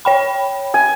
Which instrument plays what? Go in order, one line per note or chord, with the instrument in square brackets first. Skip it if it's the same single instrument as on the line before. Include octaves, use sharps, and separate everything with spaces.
[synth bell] C#5 G5 B5
[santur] G#5